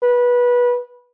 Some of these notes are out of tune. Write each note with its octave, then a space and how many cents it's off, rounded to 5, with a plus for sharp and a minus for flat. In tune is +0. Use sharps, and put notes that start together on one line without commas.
B4 -20